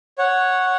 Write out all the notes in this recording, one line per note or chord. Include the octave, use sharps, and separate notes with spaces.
C#5 F#5